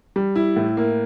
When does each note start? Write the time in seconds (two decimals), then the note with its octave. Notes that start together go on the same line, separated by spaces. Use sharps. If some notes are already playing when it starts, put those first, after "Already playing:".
0.16 G3
0.36 E4
0.56 A2
0.77 A#3